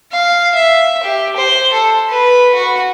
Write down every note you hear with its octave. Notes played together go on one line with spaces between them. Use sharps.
F5
E5
G4
C5
A4
B4
F#4